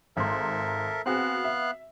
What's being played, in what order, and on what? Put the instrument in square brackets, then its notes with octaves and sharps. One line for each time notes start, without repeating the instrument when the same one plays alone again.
[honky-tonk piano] G#1 G#2 C6 [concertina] A4 A#4 E5
[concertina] B3 F5 F#6 [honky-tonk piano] C4 F#4 G#4
[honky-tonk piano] E5